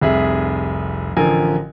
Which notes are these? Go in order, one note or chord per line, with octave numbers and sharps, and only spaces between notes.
F1 C2 G#4 E5
A1 D3 F3 A#4 G#5